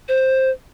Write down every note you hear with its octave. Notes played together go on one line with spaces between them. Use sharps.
C5